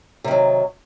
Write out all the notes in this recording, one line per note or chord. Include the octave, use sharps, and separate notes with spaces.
C3 D#3 F#3